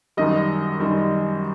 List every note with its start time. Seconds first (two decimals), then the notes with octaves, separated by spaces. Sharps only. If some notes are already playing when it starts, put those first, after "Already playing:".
0.17 F#2 D#3 G3 D#5
0.80 F#2 D#3 G3